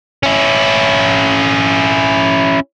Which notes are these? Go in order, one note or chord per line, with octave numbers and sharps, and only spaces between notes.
C#4 E4